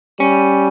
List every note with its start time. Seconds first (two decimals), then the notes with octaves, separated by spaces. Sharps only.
0.20 G3 C#4